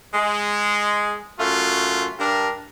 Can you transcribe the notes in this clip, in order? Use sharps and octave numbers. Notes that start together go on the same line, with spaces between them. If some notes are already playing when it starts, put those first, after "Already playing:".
G#3
F#2 A3 F4
G2 D4 A#4